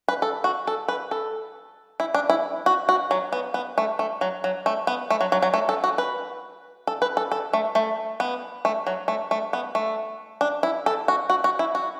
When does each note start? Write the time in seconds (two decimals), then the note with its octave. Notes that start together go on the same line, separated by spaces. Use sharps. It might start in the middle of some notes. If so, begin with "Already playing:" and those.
0.08 B4
0.22 A4
0.44 F#4
0.67 A4
0.88 B4
1.11 A4
2.00 E4
2.14 D4
2.29 E4
2.66 F#4
2.89 F#4
3.11 F#3
3.32 B3
3.54 B3
3.78 A3
3.99 A3
4.21 F#3
4.44 F#3
4.66 A3
4.87 B3
5.10 A3
5.21 F#3
5.32 F#3
5.42 F#3
5.54 A3
5.69 A4
5.84 F#4
5.98 B4
6.87 A4
7.02 B4
7.17 A4
7.31 A4
7.53 A3
7.75 A3
8.20 B3
8.65 A3
8.87 F#3
9.08 A3
9.31 A3
9.53 B3
9.75 A3
10.41 D4
10.63 E4
10.86 A4
11.08 F#4
11.30 F#4
11.44 F#4
11.59 E4
11.75 F#4